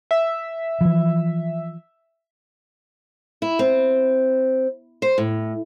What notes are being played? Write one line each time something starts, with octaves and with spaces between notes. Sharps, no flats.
E5
E3 F3
E4
C4
C5
A2